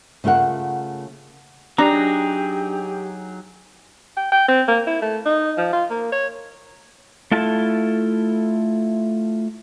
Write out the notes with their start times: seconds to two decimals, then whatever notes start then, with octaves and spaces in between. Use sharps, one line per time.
0.24 C#3 A3 F4 A#4 F#5
1.78 F#3 D4 D#4 G4 G#4 A#5
4.17 G5
4.32 G5
4.48 C4
4.68 A#3
4.87 E4
5.02 A3
5.26 D#4
5.58 F3
5.73 F4
5.91 A#3
6.12 C#5
7.32 A3 E4 F4 A4 A5